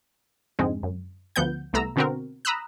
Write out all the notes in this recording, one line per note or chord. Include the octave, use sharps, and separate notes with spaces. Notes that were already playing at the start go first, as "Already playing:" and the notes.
F2 G#2 D3 G#3 C4
F#2
D2 F3 B3 F#5 G6
C2 A3 B3 A#5 E6
B2 D3 B3 C4 F#4 A#4
A#5 B5 D#6 E6 F#6